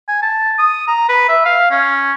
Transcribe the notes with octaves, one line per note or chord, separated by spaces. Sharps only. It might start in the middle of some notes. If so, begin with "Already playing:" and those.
G#5
A5
D#6
A#5
B4
E5
F5
C#4